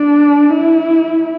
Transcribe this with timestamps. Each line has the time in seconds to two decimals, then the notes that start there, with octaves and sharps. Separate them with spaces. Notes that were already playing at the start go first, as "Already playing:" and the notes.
Already playing: D4
0.50 E4